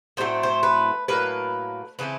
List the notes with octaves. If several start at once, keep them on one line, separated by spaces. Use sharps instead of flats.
A2 F#3 A3 C4 C5
C5
B4
A2 F#3 A#3 B4
C#3 E3 A3 C4 B4